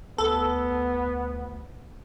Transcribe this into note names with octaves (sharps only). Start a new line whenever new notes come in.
D2 B3 A4